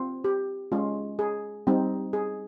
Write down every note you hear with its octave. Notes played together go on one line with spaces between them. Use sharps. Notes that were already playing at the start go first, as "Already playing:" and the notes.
Already playing: C4 F4
G4
G#3 C#4 F4
G#4
G3 C4 D#4
G#4